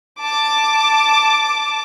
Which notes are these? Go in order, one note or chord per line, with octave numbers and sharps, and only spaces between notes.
A5 D6